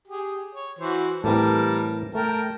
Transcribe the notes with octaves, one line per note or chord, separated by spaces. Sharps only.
G4 G#4
C#5
E3 F#4 C5
A2 E3 G3 C4 A#4 A5
A3 A#4 G5 A5